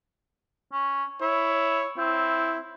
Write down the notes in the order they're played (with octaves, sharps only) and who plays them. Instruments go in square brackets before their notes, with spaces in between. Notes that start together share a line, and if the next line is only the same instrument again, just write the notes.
[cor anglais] C#4
[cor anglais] E4 [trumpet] C#5
[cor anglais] C4 [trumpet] E4